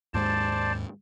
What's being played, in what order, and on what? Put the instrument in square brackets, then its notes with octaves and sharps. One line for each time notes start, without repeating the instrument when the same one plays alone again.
[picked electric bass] D#2 G#2 G#3 [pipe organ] C5 D5 A5